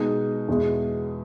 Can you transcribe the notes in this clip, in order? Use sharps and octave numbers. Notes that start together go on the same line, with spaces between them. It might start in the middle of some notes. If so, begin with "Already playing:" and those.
Already playing: B2 G#3 D#4
E2 B2 G#3